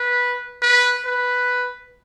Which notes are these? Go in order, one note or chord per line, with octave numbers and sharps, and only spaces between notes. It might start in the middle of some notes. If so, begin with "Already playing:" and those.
Already playing: B4
B4
B4